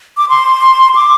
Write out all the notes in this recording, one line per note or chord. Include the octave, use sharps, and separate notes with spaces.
D6
C6
D6